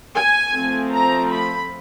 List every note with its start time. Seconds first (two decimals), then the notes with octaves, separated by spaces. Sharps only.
0.15 G#5
0.53 F3 A3 C4
0.93 A#5
1.32 B5